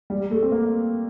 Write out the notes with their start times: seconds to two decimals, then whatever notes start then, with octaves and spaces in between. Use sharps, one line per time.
0.10 G3
0.31 A3
0.43 C4
0.52 A#3